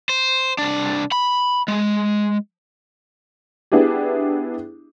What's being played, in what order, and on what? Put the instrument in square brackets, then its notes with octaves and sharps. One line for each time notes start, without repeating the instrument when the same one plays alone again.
[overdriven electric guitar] C5
C2 D4
B5
G#3
[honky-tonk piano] B3 D4 E4 G4 G#4